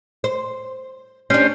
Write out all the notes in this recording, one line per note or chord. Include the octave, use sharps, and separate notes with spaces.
C5
C#4 D4 G4 C5